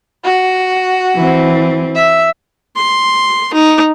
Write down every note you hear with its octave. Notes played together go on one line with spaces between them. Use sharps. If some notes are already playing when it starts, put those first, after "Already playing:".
F#4
E3 C4
E5
C6
D#4